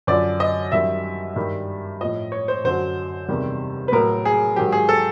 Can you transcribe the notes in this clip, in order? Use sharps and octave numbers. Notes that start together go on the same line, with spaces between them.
F#2 D3 F3 D5
D#5
F#2 D#3 G3 E5
G2 D#3 G3
A2 F3 D#5
C#5
C5
F#2 D3 F#3 C5
E2 C3 D#3 G3
B4
A2 F#3 A#4
G#4
G#2 D#3 F#3 G4
G#4
A4